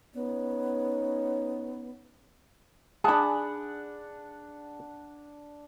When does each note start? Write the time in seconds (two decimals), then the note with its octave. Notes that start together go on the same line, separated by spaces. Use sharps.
0.14 B3 C#4 D#4 C#5
3.04 D4 G#4 F#5 A5 B5